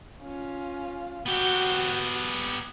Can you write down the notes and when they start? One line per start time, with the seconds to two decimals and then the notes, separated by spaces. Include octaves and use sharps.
0.21 C#4 F4
1.26 B3 F#4 G4